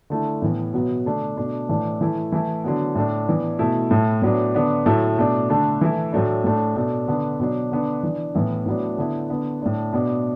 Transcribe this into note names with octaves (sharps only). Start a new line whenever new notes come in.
D3 A3 E4
A2 E3 B3
B2 F#3 B3
D3 A3 D4
B2 A3 D4
A2 E3 A3 D4
E3 A3 E4
E3 A3 E4
D3 F#3 B3
A2 A3 D4
E3 B3 D4
B2 A3 E4
A2 A3 E4
A2 F#3 B3 D4
D3 B3 D4
A2 F#3 A3 E4
B2 A3 D4
D3 A3 D4
E3 A3 E4
A2 F#3 A3 D4
A2 A3 D4
B2 A3 D4
D3 B3 D4
B2 F#3 D4
D3 B3 D4
E3 D4
A2 E3 B3 E4
A2 F#3 B3 D4
D3 B3 E4
D3 B3 D4
A2 A3 D4
B2 B3 D4